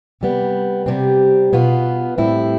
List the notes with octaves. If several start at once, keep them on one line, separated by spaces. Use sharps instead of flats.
C3 G3 B3
C3 G3 C4
B2 B3 F4
A2 G3 C4 E4